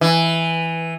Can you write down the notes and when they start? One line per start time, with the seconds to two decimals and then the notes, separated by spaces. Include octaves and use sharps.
0.01 E3